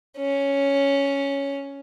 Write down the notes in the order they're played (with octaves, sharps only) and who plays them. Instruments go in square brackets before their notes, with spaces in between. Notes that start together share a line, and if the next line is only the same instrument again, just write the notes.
[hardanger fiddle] C#4